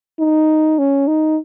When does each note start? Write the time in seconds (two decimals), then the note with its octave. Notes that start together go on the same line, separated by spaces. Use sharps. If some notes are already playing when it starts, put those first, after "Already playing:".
0.20 D#4
0.79 C#4
1.08 D#4